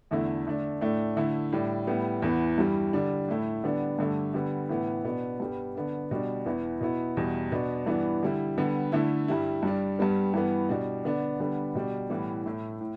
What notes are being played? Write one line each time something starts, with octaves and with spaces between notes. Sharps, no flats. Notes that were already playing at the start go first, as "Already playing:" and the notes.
E2 D3 A3 E4
D3 A3 D4
A2 A3 D4
D3 A3 E4
A2 G3 D4
A2 G3 B3
E2 E3 B3
G2 E3 G3
D3 G3 D4
A2 A3 E4
D3 G3 B3 D4
G2 D3 A3 D4
D3 G3 B3
A2 E3 B3
B2 B3 D4
G2 G3 B3
D3 B3 D4
B2 G3 D4
E2 E3 B3 E4
B2 B3 E4
E2 B2 G3
B2 B3 D4
G2 E3 B3 D4
D3 G3 E4
D3 G3 B3
D3 A3 E4
G2 G3 E4
G2 G3 D4
G2 G3 B3
G2 E3 B3
B2 G3 D4
D3 B3 D4
D3 G3 B3 D4
B2 G3 D4
A2 E3 G3 B3
A2 A3 E4
A2